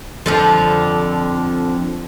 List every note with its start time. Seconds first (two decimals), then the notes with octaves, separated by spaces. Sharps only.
0.26 F2 D3 F3